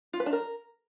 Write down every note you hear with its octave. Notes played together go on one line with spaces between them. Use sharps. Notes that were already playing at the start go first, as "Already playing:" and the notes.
F4
B4
D4
A#4